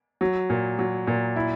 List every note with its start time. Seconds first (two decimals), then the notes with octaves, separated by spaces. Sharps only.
0.21 F#3
0.50 A#2
0.79 F#3
1.07 A#2
1.36 E4